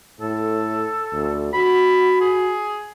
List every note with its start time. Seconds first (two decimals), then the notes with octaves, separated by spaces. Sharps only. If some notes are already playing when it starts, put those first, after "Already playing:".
0.20 A2 A4
1.14 D2
1.54 F#4 B5
2.21 G#4